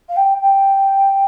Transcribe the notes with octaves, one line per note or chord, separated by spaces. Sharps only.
F5
G5
G5